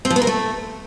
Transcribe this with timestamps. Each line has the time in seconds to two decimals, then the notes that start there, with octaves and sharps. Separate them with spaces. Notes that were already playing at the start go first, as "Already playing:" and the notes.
0.05 C4
0.10 F3
0.16 B3
0.22 A#4
0.27 A3